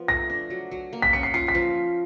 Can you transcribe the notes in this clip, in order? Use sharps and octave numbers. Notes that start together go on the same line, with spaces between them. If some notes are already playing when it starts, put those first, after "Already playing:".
Already playing: F3 B3
A3 A#6
D4
F#3
F#3
A#3
B6
C#4 C#7
C7
F4 C7
B6
F3